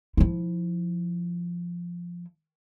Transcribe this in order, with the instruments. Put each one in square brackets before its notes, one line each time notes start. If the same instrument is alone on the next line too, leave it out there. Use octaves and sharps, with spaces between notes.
[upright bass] F3 E4